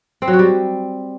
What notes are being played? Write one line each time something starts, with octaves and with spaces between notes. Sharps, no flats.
C4
F#3
F#4
G3